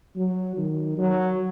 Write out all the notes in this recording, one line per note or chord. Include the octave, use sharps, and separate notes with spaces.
F#3
D#3
F#3